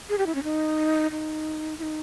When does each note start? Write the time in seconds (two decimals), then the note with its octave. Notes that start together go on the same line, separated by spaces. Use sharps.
0.09 G#4
0.18 G4
0.26 E4
0.35 C#4
0.43 D#4
1.11 D#4
1.79 E4
1.83 D#4